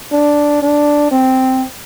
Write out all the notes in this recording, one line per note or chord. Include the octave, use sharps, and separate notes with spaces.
D4
D4
C4